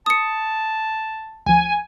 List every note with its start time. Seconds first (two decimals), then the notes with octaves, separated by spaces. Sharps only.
0.06 A5 D#6 C#7
1.46 D2 F3 G#5